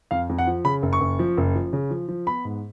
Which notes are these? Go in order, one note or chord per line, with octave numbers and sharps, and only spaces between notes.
F2 F5
F2
F#5
F3
C#3 B5
F#1
C#6
F#1
F3
F#1
F3
C#3
F3
F3
B3 B5
G#2